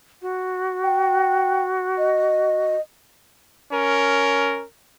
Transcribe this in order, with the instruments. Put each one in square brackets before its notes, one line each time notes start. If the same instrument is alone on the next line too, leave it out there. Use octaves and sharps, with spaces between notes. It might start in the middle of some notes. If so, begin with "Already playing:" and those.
[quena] F#4
[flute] G5
D#5
[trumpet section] C#4 A#4